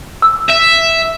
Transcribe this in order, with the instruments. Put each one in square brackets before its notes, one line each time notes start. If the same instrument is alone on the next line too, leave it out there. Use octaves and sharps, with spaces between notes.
[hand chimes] E6
[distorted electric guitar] E5